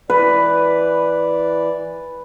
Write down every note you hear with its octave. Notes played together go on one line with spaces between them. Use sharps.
E3 B4 D5